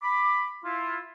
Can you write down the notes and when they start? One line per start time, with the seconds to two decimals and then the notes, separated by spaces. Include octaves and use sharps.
0.02 B5 D6
0.65 E4 F4